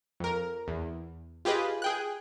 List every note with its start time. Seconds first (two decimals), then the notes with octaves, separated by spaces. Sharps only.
0.20 F2 A#4
0.68 E2
1.45 F4 G4 G#4 B4 D#5
1.82 G#4 G5 F#6